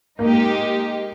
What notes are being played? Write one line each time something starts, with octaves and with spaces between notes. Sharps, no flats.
G#3 A#3 D#4 G4